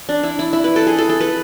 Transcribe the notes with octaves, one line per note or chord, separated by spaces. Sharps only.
D4
E4
E4
E4
B4
A4
G#4
A4
A4
B4